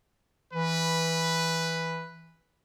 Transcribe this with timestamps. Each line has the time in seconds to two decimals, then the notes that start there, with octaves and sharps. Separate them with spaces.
0.53 E3 B4